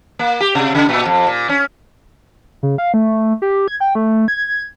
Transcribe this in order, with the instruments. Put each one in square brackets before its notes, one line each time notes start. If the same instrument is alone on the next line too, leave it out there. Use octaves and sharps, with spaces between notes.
[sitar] A#3
G4
C3
C#3
A#2
F2
A#2
C#4
[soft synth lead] C#3
F5
A3
G4
G#6
G5
A3
G#6